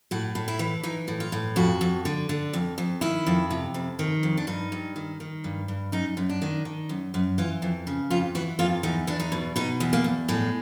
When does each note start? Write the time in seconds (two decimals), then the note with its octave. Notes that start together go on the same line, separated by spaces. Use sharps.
0.11 A2 F#4
0.35 A2
0.48 E4
0.59 E3
0.83 E3 D#4
1.08 A2
1.20 F4
1.32 A2
1.56 F2 F#4
1.81 F2
2.05 D3
2.29 D3
2.53 F2
2.78 F2
3.01 D#3 E4
3.27 F2
3.51 C3
3.74 F2
3.99 D#3
4.23 F2
4.37 D4
4.47 G2 D#4
4.72 G2
4.96 D#3
5.20 D#3
5.44 G2
5.68 G2
5.92 F#2 D#4
6.17 F#2
6.29 D4
6.42 D#3
6.65 D#3
6.89 F#2
7.14 F#2
7.38 E3 F4
7.62 F2
7.87 C#3
8.10 F2 F4
8.35 E3 F#4
8.59 F2 F4
8.83 E2 D#4
9.07 E2 D4
9.20 D#4
9.32 B2
9.56 B2 D#4
9.80 E2
9.93 A#3
10.04 E2
10.28 A2 G#3